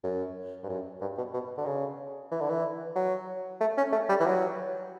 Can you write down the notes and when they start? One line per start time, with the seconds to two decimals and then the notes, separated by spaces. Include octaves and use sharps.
0.04 F#2
0.63 G2
0.69 F#2
1.01 G2
1.17 B2
1.34 B2
1.57 D3
1.66 C#3
2.31 E3
2.41 D3
2.50 E3
2.96 F#3
3.61 A3
3.77 C#4
3.92 A3
4.09 G3
4.20 E3
4.26 F#3